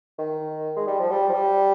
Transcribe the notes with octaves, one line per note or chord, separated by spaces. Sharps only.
D#3
G#3
G3
F3
G3
F3
G3